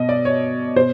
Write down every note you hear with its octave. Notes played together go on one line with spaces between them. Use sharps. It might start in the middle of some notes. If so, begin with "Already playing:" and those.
Already playing: B2 D#5
D5
C#5
B2 C5